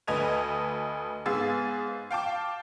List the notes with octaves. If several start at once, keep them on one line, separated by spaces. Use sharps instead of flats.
D2 B4 D#5 A5 G#6 F7
G#2 B3 G#4 F5 E6 A6
F5 G5 A5 D6